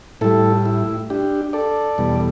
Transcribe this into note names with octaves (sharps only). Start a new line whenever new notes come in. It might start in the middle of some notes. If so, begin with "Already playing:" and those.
A2 G3 E4 A4
E4
D4 G4
A4 D5
E2 B2 G3